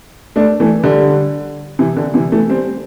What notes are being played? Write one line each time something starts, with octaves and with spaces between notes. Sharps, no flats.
A3 D4
E3 A3
D3 G3
C3 E3
D3
C3 E3
E3 A3
G3 C4